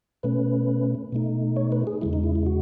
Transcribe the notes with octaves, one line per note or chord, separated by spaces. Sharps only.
B2 A3 C#4 B4
B2 A3 D#4
C#5
B4
G#4
E2 C#3 G#3 E4
D#4
E4
E4
F#4